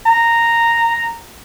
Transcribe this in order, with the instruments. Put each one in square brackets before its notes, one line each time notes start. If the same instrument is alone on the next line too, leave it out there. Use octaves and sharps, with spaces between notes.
[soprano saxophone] A#5